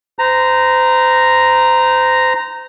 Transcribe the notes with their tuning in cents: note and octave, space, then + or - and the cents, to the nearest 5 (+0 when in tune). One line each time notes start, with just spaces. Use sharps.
C5 -30 A#5 +0